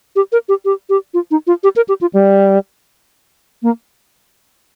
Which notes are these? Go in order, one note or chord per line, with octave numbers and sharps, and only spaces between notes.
G4
A#4
G4
G4
G4
F4
D#4
F4
G4
A#4
G4
F4
G3
A#3